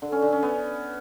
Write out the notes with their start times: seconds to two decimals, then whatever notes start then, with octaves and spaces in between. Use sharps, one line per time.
0.02 D3
0.12 C#4
0.22 D3
0.32 C#4
0.43 B3